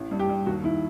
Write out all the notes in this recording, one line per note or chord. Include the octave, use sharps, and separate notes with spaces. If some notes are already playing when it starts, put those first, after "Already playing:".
Already playing: A1
G2
G4
G2
D#2 F#4
D#3 E4